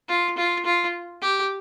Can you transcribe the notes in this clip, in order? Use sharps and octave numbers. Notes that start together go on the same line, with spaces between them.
F4
F4
F4
G4